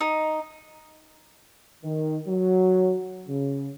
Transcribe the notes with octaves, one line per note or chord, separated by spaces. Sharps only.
D#4
D#3
F#3
C#3